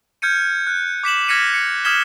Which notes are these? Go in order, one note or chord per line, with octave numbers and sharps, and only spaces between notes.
F6 G6 G#6 C#7 D#7
F#6
D6 B6 E7 F#7
F6 G#6 A#6 B6 C#7 D#7
C#7
D#6 F6 G#6 B6 E7 G7